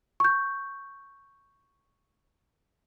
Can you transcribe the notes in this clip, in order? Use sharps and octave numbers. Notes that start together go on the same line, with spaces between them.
C#6 G6